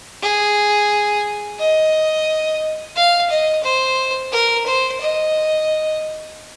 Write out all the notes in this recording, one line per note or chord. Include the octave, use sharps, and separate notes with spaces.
G#4
D#5
F5
D#5
C5
A#4
C5
D#5